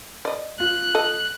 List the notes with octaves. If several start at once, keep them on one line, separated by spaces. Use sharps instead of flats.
D5 D#5
F4 F#6
A4 D#5